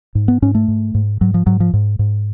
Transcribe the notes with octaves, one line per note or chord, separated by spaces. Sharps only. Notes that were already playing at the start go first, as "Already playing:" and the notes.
G#2
B3
G#2 C#4
A3
G#2
G#2
G#2 F#3
F3
G#2 F#3
F3
G#2
G#2